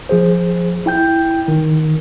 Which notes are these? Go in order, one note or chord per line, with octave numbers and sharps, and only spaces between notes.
F3 G#4 C5
E4 G5 G6
D#3